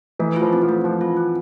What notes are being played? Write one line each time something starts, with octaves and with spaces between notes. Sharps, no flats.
E3 A3
F4
F3
C4
F3
A3
F3 C4
F4
C4